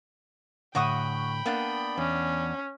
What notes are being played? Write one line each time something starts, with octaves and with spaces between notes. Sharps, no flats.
A2 D3 F#4 G5 B5 C#6 D#6
A#3 B3 D4
E2 C#4